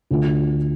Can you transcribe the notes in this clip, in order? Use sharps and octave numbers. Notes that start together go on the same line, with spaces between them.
D2 D3 A3 D4 F4